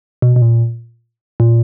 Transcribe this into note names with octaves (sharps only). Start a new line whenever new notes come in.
B2
B2
A#2
A#2